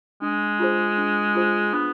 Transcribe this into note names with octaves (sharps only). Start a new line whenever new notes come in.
G#3 D4
F4 G#4 C5
D4
F4 G#4 C5
B3 D4